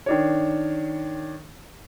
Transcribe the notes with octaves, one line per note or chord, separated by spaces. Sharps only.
D#3 D4 C#5